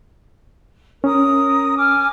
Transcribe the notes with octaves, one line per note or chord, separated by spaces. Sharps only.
C#4 A#4 D#6
G#5 D6 F6